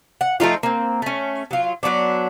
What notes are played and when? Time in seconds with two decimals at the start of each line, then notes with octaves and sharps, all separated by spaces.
0.21 F#5
0.40 F3 A3 D#4 F4
0.63 A#3 C4
1.02 A3 C#4
1.51 F#3 F4
1.83 F#3 G3 B3 D4